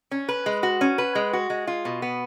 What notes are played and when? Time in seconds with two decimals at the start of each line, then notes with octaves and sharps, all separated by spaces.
0.11 C#4
0.29 B4
0.46 G#3
0.63 F#4
0.81 C#4
0.98 B4
1.15 G#3
1.33 F#4
1.50 G#3
1.67 F4
1.85 B2
2.02 B3